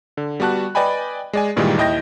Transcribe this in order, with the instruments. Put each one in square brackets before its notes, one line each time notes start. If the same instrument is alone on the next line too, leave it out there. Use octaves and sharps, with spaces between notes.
[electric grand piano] D3
G3 B3 F#4 A5 F#6
B4 D5 D#5 G5 G#5 B5
G#3 D5 G#5
G2 A#2 D#3 E3 G3 G#3
D#2 E4 D#5 G5 G6 A#6